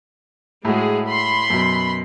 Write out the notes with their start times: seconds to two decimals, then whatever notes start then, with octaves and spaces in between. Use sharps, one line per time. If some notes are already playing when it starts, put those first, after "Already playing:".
0.65 A2 G#3 F#4 G#4
1.08 B5 C6
1.50 F#2 B2